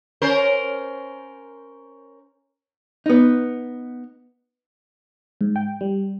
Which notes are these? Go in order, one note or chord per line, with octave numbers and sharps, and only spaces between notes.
C#4 A#4 C5
B3 D#4
G#2
G5
G3